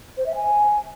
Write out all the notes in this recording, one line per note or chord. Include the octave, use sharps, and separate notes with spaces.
C5
E5
G#5